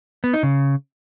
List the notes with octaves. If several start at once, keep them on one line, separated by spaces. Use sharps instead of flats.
B3
D#4
C#3